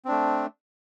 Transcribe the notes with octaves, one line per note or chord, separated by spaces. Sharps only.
A3 C4 D4